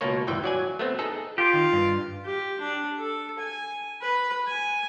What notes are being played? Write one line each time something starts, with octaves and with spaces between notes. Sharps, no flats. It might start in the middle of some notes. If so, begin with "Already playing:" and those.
C#2 B2 A#3 C#5
G1 D2 E3 G5
F#3 D5 G#5
A3 B3 C4
D#4 G#4 A4
F4 G4
D#3
G2
G4
D4
A4
G#5
B4
G#5